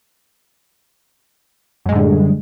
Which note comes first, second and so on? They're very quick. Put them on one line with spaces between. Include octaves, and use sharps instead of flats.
F#2 G#3 A2 D3 G3